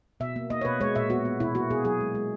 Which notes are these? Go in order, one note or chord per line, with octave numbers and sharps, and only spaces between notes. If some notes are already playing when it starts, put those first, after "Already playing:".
B2 E5
A#3
A#3 D#5
C#5
B2 B4
G#3 C#5
A#2 E5
B3 F#4
B3
B2 E4
A#3 F#4
B2 G#4
F#3 G#4
G#3
G#3